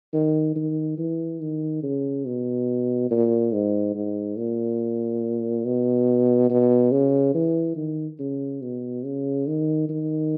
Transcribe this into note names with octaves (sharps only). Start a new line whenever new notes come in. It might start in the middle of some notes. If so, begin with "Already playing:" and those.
D#3
D#3
E3
D#3
C#3
B2
A#2
G#2
G#2
A#2
B2
B2
C#3
E3
D#3
C#3
B2
C#3
D#3
D#3